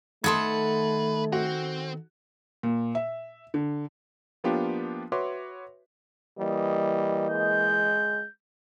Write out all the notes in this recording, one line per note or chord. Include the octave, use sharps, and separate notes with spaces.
D#3 A3 A4 B4 F#5 C6 D#6 G#6
C4 F#4
A#2
E5
D3
F3 A#3 B3 D4 F4 G4
F#4 B4 C#5 E5 C6 D6
E3 G3 A#3 D#5
G#3 G6